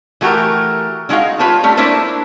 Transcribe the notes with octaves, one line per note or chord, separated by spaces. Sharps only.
E3 A3 F#4 G4 A#4
D3 G#3 D#4 F#4 F5
F4 G4 B4 C#5 A5
G3 A3 C#4
A#3 D4 E4 B4 C5